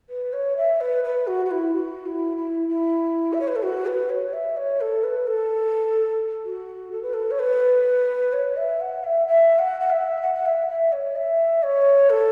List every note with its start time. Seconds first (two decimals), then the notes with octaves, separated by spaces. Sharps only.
0.10 B4
0.33 C#5
0.57 E5
0.81 B4
1.04 B4
1.27 F#4
1.45 F#4
1.51 E4
1.74 F#4
2.06 E4
2.37 E4
2.68 E4
3.33 E5
3.40 C#5
3.48 B4
3.56 A4
3.63 F#4
3.86 B4
4.09 C#5
4.33 E5
4.57 C#5
4.81 A4
5.04 B4
5.27 A4
6.45 F#4
6.92 A4
7.03 B4
7.14 A4
7.31 C#5
7.39 B4
8.33 C#5
8.57 E5
8.81 F#5
9.04 E5
9.27 E5
9.59 F#5
9.80 F#5
9.90 E5
10.22 F#5
10.34 F#5
10.46 E5
10.69 E5
10.92 C#5
11.16 E5
11.63 C#5
12.10 A4